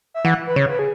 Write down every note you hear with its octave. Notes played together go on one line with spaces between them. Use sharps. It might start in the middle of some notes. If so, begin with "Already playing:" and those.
E5
E3 F#5
B4
C#3 C#5
B4
G#4